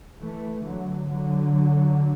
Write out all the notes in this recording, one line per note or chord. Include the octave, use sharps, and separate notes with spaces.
E3 A3
D3 F#3
D3 F#3